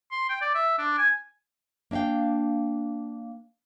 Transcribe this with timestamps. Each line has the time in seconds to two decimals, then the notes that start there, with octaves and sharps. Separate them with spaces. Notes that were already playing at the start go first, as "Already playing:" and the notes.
0.11 C6
0.29 G5
0.41 D5
0.55 E5
0.78 D4
0.98 G#5
1.91 A#3 D4 E5 F5 G5